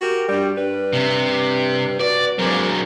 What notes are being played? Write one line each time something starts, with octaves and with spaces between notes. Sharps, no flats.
F#4 G4 A#4
G2 G3
G2 G3 B4
C3
F#4 B4 D5
F#3 G#3 A#3 C4 D4